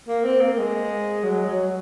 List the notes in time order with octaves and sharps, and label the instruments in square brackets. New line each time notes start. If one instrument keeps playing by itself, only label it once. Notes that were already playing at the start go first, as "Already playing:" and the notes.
[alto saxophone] A#3
C4
A#3
G#3
F#3
F#3